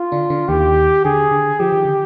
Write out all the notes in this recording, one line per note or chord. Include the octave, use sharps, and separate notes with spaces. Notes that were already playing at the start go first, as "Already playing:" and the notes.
Already playing: F4
D3 D4
D3 D4
D#2 D#3 G4
D3 G#4
D3
F3 G4
D#3
D3